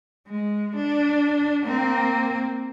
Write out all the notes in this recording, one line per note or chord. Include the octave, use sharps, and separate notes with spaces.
G#3
D4
A#3 C4